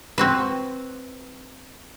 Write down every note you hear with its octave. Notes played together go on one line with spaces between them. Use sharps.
C4 F#4 B4